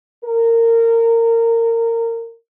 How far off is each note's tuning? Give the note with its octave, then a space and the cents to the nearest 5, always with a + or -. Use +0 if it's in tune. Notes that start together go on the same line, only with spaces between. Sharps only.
A#4 -20